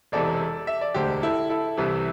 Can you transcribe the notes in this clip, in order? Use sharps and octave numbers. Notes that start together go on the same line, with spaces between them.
E1 E2 C3 E3 A4 D5
E5
D5
E1 D2 D3 G4 C5
E4 A4
E4 A4
C2 C3 E3